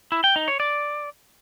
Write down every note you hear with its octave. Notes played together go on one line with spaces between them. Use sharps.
E4
G5
D#4
C#5
D5